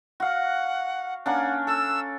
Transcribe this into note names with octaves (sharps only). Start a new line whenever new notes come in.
F#4 F5 F#5
A#3 C#4 D4 F#5
A4 E6